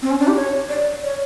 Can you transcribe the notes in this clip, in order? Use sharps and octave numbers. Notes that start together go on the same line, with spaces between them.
C4
C#4
D4
G4
C#5
D5
C#5